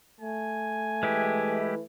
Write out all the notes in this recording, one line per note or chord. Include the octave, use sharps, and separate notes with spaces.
A3 G#5
E3 G#3 E4 G4